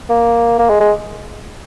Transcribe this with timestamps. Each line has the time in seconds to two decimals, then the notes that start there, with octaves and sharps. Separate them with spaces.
0.09 A#3
0.58 A#3
0.69 G#3
0.80 G#3